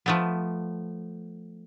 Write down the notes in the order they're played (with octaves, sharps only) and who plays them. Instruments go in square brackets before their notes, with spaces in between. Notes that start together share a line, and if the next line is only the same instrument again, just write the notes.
[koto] F3 A3 B3